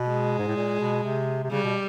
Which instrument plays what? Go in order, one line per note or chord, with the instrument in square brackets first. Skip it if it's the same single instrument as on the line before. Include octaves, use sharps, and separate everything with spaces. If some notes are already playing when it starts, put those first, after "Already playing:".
Already playing: [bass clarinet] B2
[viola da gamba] G#3
[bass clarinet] G#2
A2
A#2
B2
C3
C3
[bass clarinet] C#3 [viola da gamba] G3
[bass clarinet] B2